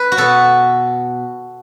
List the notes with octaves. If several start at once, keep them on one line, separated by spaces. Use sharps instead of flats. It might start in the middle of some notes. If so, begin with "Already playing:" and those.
Already playing: B4
F#4
B2 B3 A4